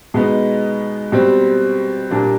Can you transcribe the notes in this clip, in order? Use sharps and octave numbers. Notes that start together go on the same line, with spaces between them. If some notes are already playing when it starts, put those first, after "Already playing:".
B2 G#3 B3 D#4
B2 G3 C4
A#2 G3 A#3 D4